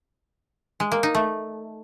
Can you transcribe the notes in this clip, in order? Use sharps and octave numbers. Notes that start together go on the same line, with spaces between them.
G#3
A#3
D#4
A3